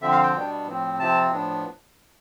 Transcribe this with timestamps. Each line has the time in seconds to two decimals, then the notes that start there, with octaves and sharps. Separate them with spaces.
0.01 D3 F3 C4 E5
0.12 F5
0.23 G5
0.34 B2 G3 B3 D4
0.67 A2 F3 C4
0.99 C3 F3 C4 A5
1.31 A2 F3 B3 D4